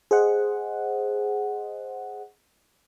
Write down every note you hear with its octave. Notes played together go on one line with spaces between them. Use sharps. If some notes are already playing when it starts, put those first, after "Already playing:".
G#4 C5 D#5 F#5